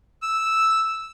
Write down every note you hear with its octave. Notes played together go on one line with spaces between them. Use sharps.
E6